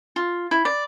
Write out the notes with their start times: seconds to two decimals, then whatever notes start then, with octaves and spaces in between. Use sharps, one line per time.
0.16 F4
0.51 E4
0.65 D5